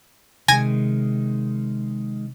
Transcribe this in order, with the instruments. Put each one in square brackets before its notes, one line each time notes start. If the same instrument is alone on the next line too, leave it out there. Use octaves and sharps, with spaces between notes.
[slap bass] C3 [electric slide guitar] D#3 G#3 [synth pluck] G#5 G#6 A#6